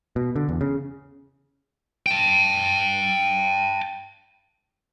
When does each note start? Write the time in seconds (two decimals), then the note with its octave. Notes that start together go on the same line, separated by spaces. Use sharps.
0.16 B2
0.36 D3
0.49 E2
0.61 C#3
2.07 G5 A5